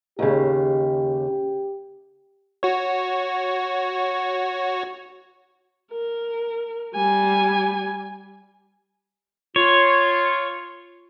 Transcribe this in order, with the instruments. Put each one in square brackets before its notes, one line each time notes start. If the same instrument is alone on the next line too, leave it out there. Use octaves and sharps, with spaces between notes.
[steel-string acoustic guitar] D#2 C#3 [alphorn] G4
[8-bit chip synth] F#4 C#5
[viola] A#4
G3 G#5
[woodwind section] F4 [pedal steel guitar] C#5